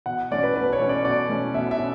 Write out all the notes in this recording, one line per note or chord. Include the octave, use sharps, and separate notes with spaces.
B2 F#5
A3 C#4 D5
B4
B2 B4
C#5
A3 C#4
D5
B2 D5
A3 C#4
B2 E5
E5
C#4